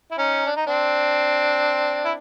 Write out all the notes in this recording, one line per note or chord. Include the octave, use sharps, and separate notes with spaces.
E4
C#4 D#4
D4
D#4
C4 D4
E4